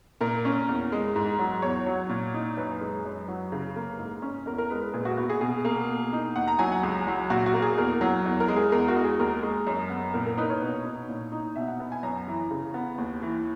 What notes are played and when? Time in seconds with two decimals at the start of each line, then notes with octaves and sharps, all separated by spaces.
0.21 A#2 A#4
0.45 C#4
0.69 E2
0.92 G#3
1.16 G#2
1.39 F#3
1.62 E2 C#5
1.86 F#3
2.09 A#2
2.34 D#4
2.57 F#2 B4
2.81 G#3
3.05 F#2
3.28 F#3
3.52 C#3
3.76 A#3
3.99 G#2
4.22 C#4
4.46 E2 A#4
4.58 A#4
4.70 G#3 B4
4.81 B4
4.93 A#2 G#4
5.05 F#4
5.17 B3 F#4
5.30 G#4
5.41 B2 G#4
5.65 A#3
5.88 B2
6.13 D#4
6.36 D#2 F#5
6.47 A#5
6.59 F#3 G#5
6.72 F#5
6.83 C#2
7.07 F#3
7.30 A#2 F#4
7.46 F#4
7.54 A#3
7.62 G#4
7.77 E2 A#4
8.01 F#3
8.26 E2
8.40 A#4
8.48 G#3
8.56 G#4
8.72 E2 A#4
8.88 F#4
8.96 G#3
9.04 G#4
9.19 D#2 A#4
9.43 G#3
9.67 F#2
9.90 B3
10.14 A#2 A#4
10.26 A#4
10.37 D#4 B4
10.50 C#5
10.62 B2
10.85 D#4
11.09 A#2
11.32 D#4
11.56 B2 E5
11.68 F#5
11.80 B3
11.92 G#5
12.03 F#2 A#5
12.28 E3
12.51 C#3
12.74 B3
12.98 D#2
13.22 E3